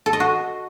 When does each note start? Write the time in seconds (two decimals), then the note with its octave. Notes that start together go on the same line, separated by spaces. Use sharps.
0.06 A4
0.13 D#5
0.20 F#4